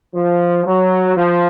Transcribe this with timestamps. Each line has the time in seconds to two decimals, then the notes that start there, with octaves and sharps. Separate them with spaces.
0.15 F3
0.66 F#3
1.17 F3